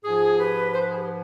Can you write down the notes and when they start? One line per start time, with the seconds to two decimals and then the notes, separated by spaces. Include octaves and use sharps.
0.04 G#2 F3 F4 G#4
0.39 G4 B4
0.75 C5
0.82 B4
0.91 G#4
0.98 G4 B4